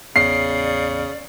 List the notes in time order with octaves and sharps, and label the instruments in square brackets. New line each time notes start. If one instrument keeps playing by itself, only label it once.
[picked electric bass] A1 E2 B3 [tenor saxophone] C#3 [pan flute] D5 [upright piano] C7